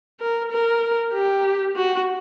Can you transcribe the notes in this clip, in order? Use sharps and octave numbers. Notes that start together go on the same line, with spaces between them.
A#4
A#4
G4
F#4